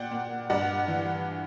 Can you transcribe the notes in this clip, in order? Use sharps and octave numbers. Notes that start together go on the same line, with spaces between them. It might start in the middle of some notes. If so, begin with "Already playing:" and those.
Already playing: A#2 D5 F#5 G5
A#2
G2 D5 F#5
E3